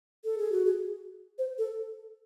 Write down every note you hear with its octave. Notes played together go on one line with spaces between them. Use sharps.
A4
G#4
F#4
G#4
C5
A4